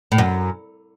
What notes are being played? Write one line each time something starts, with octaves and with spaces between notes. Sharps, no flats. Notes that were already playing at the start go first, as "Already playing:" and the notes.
A2
F#2